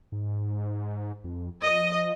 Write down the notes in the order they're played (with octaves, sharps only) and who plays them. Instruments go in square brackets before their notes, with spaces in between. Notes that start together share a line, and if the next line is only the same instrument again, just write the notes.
[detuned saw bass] G#2
F2
[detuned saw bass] F3 [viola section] D#5